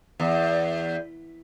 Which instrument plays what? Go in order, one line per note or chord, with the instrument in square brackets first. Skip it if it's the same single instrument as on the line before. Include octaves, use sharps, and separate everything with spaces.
[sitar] E2